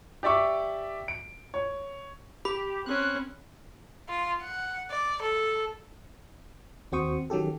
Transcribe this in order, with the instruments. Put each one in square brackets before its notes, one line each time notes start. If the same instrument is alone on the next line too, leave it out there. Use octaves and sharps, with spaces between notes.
[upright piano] G4 D5 E5 C#6 D6
D7
C#5
[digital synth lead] G4 [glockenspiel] B5
[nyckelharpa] C4 C#4 [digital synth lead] F#6
[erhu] F4
F#5
D5
A4
[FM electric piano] D#2 C4 F#4 C5 C#6 D#6
D#3 F#3 C#4 G4 A4